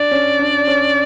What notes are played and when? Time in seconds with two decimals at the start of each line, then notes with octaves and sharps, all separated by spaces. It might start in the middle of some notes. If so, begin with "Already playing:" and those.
Already playing: D4 D5
0.11 C#4
0.39 D4
0.67 C#4